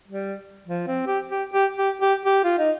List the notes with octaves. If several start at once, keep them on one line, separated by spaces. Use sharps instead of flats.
G3
F3
C4
G4
G4
G4
G4
G4
G4
F4
D#4